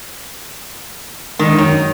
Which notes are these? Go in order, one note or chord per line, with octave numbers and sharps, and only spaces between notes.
D#3 G#3 D4 D#5
F#2 D#3 C#5